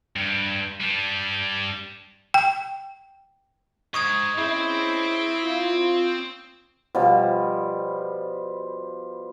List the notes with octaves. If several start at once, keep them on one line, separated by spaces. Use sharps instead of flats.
G2
G3 D4
G5
G#2 C#6 D#6 G#6
C4 C#4 D#4 E4 G#4
F4
B2 F3 G3